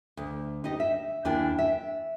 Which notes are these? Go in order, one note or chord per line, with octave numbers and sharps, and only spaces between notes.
D2
D#4 G4 D#5
E5
D#2 A#3 D4 E4 G5 G#5
E5